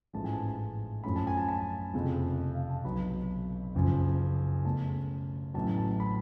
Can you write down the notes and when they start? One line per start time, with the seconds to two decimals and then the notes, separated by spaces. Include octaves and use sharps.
0.13 A1 G#2 F3 A3 A5
0.24 G#5
0.33 A5
1.04 F#2 F3 A3 C#4 B5
1.16 A5
1.27 G#5
1.37 A5
1.49 A5
1.94 F1 F2 C#3 F3
2.55 F5
2.70 A5
2.84 B1 B2 F#3 B3 B5
3.75 F#1 F#2 F3
4.65 C#2 B2 A3 C#4 A5
5.54 A1 A2 F#3 A5
5.78 A5
6.00 B5